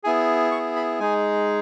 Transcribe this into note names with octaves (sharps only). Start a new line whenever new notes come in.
B3 E4 G#4 G#5
C#6
B5
G#3 D#4 G#4 G#5